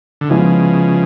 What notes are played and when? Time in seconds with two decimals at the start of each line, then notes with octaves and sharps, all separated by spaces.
0.21 D3
0.29 C#3 F3 G#3 B3 E4